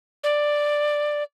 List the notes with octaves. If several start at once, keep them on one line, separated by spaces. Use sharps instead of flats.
D5